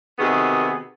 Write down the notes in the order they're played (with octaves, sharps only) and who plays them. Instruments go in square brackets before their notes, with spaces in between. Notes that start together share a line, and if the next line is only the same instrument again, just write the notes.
[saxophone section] C3 D#3 B3 F#4 G#4